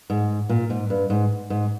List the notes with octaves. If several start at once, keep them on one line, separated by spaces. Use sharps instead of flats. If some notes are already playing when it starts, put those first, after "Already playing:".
G#2
A#2
G#2
G2
G#2
G#2